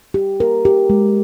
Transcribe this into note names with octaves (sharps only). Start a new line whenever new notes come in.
G4
A#4
G4
G#3